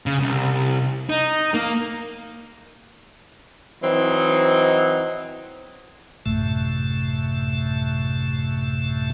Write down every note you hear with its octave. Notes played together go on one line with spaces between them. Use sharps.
C#3
C2
D#4
A#3
E3 F#3 C4 D#4
A1 F#2 A2 C3 A3